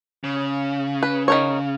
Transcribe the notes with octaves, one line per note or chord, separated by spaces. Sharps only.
C#3
B4
D#3 A#4 C#5